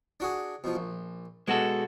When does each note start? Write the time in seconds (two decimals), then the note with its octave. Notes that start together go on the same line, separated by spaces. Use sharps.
0.20 D4 F#4 G#4
0.64 B2 F3
0.75 A#1
1.48 B2 G#3 F#4 A4